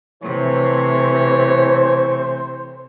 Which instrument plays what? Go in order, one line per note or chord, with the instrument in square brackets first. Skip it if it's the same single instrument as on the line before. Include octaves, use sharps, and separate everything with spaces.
[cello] C3 [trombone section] E3 A3 [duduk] C5 [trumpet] C#5